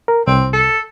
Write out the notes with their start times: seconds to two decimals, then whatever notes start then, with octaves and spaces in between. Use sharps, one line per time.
0.08 A#4
0.27 C2 C4
0.53 A4